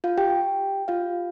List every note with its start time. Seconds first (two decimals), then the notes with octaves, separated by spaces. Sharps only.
0.04 F4 F5
0.18 G4 G5
0.88 F4 F5